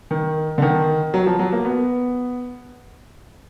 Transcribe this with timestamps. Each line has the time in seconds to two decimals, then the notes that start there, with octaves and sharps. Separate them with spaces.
0.11 D#3
0.58 D3
0.62 D#3
1.14 F#3
1.26 F3
1.39 F#3
1.53 A#3
1.65 B3